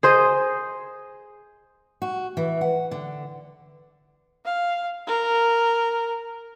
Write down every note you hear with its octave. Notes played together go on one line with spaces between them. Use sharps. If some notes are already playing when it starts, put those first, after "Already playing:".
G#4 C5 D#5
F#4
E3
F#5
D3
F5
A#4